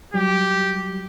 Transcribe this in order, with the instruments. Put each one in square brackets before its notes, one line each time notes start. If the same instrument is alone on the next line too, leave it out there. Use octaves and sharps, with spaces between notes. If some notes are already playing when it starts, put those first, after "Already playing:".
[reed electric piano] F#3 G3 [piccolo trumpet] G4